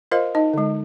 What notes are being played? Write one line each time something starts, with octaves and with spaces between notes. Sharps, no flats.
F4 A#4 C5 D#5 F5
D#4 D#5
D3 G#3